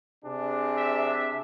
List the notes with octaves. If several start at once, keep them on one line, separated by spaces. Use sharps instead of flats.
C3 D4 G#4
E5